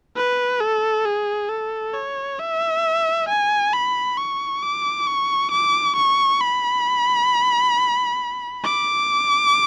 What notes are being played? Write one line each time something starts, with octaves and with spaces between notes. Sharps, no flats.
B4
A4
G#4
A4
C#5
E5
G#5
B5
C#6
D6
C#6
D6
C#6
B5
D6